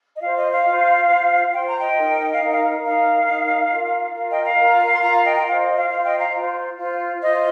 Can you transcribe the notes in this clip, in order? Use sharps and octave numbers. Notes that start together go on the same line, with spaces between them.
D#5
F4 C5 F5
D#5
F5
F4 C5
F4 C5
F4 C5 G5
A#5
D#5 G5
D#4 A#4
F5
D#4 A#4 D#5
F5
D#4 A#4 F5
D#4 A#4
F4 A#4
F4 A#4 F5
D#5 G5
F5 A#5
F4 A#4
C6
F4 A#4 F5 A#5
D#5 G5
G5
F4 C5 F5
D#5
F5
F4 C5 F5
D#5 G5
F5 A#5
F4 C5
F4 C5
F4 C5 D#5